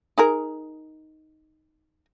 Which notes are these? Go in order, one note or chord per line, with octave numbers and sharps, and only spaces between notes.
D#4 G#4 A#4